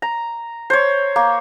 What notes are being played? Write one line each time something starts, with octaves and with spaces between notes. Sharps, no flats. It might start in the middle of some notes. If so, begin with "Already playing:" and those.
A#5
C5 C#5
A#3